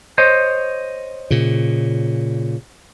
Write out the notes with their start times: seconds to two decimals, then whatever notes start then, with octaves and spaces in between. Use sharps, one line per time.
0.18 C5 C#5 D#5
1.31 A#2 C#3